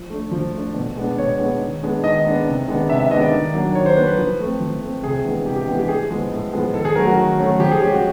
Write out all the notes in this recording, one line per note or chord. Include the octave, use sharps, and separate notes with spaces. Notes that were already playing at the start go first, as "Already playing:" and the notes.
Already playing: F3
A3 D4
F3
A3 D4
B2
G#3 B3 D4
B2 C#5
G#3 B3 D4
D#3
G#3 B3 D4
D#3 D#5
G#3 B3 D4
C3
D#3 G#3 B3 D4
C3 E5
E5
D#3 G#3 B3 D4 D#5
D5
D#3
F#3 A#3 D4
D#3 C#5
C5
F#3 A#3 D4 B4
B4
F3
A3 C4
F3
A3 C4
C3 G#4
E3 G#3 B3 D4
C3 G4
G4
E3 G#3 B3 D4
G4
A2 G#4
F3 G#3 B3
A2
F3 G#3 B3
D#3 A4
G#4
F#3 A3 C#4 A#4
F#4
D#3
F#3 A3 C#4
F3 G4
G#4
G#3 C#4 G4
F#4